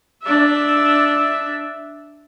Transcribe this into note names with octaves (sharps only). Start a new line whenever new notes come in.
D4 E5